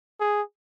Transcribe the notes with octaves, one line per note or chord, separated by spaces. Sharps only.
G#4